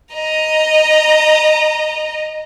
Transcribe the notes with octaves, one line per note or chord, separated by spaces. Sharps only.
D#5 A#5